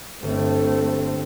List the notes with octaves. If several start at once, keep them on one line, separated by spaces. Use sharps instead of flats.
G1 A3 C4